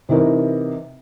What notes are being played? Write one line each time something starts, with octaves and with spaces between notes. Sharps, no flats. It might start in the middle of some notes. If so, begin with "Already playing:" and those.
C3 E3 D#4 A#4